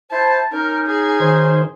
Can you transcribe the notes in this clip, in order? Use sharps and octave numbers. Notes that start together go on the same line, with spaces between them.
E4 C5 A5
C#4 D#4 A#4
G#4
D#3 C5